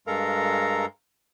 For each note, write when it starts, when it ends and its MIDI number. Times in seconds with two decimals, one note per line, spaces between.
0.07 0.86 43
0.07 0.86 56
0.07 0.86 69
0.07 0.86 70
0.07 0.86 77
0.07 0.86 82